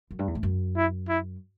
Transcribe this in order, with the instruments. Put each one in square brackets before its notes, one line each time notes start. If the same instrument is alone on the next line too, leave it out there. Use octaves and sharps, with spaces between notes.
[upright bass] F#2
G2
E2
A2
F#2
[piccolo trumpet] E4
E4